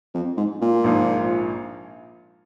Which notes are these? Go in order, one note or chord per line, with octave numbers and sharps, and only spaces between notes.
F2
G#2
A#2
A#1 G#2 F3 A#3 F4